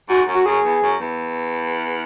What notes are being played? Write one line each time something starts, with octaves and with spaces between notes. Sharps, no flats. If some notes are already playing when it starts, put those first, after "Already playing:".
G#2 F#4
F#2
F#4
F#2 G#4
E2
F#2
E2